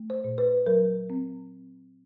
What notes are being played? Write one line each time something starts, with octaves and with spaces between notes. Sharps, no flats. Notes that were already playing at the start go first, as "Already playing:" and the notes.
Already playing: A3
C5
A#2
B4
F#3 A#4
C4